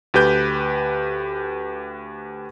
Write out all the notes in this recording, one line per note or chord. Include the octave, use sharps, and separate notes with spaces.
D2 G4 B4 G6